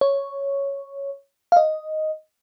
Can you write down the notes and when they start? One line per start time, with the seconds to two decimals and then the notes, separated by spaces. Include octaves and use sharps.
0.01 C#5
1.52 F5
1.57 D#5